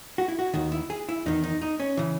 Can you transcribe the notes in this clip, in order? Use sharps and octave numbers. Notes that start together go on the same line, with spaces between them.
F#4
E4
F#4
D#2 D#3 F#4
E4
G#4
E4
E2 D#3 D#4
D#4
D#4
C#4
C#3 E3